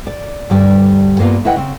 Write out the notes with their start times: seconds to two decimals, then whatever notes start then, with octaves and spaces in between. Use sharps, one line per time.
0.07 D5
0.50 D2 G2 G3 D5
1.19 G2 A#3 B3 F4
1.45 D#2 E4 B4 D#5 F#5 G5
1.56 C#3 C4